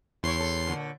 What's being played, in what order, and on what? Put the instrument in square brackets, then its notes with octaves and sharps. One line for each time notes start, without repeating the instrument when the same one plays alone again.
[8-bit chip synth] E2 C6 C7 [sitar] E4 C5 C#5
[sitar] A4
A#2 D3